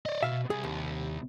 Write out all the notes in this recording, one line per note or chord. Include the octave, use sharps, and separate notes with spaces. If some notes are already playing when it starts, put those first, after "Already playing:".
D5 D#5
B2 E5 F5
C2 G#4
D#2